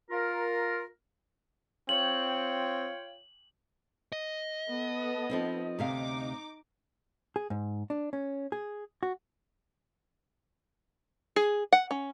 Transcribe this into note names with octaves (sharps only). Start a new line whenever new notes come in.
F4 A#4
C4 F4 C#5 G5 F#7
D#5
B3 A4
F3 C4 D#4
D2 C3 D#4 F5 D6
G#4
G#2
D4
C#4
G#4
F#4
G#4
F#5
C#4